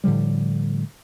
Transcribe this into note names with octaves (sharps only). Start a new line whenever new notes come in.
A2 D3 F3 G3